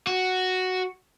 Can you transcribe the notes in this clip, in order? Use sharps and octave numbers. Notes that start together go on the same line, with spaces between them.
F#4